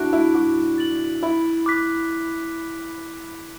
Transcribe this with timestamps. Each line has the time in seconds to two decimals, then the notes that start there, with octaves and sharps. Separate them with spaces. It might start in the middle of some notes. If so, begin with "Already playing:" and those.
Already playing: D4 E4 F#4 F#6 D7
0.13 E4
0.34 F#4 D6
0.78 A6 F#7
1.23 E4 B5
1.66 D6 F#6 B6